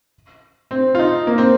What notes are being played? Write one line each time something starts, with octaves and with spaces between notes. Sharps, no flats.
C4
F4
D#4
A#3
C4